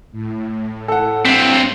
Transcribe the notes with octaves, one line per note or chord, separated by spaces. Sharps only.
A2
A4 F#5
G2 C4 B6